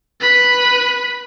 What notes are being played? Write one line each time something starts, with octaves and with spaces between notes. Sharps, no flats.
B4 B5